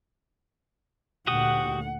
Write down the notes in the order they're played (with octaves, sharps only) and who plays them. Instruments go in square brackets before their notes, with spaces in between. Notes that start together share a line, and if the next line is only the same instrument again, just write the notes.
[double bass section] D2 A#2 [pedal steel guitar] F#4 G4 D#6 [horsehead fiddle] F#5